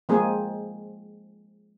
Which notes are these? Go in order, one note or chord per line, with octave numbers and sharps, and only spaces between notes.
F3 G#3 A#3 C4 G#4